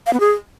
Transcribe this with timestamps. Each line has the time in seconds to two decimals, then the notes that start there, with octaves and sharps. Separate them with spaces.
0.06 F5
0.13 B3
0.20 G#4